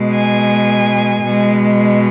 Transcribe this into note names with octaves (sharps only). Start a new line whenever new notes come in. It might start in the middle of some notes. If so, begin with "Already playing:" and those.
Already playing: B2 G#3
G#5
B2 G#3